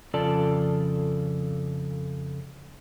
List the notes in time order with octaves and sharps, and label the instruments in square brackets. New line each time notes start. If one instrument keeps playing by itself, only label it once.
[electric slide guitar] F2 C#3 F4 A4 D5 A5